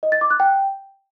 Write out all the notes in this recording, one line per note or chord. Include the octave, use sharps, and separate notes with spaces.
D#5
A6
D6
F#6
G5